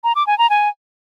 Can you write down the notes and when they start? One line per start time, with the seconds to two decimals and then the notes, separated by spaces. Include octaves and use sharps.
0.04 A#5
0.15 D6
0.27 G#5
0.38 A#5
0.50 G#5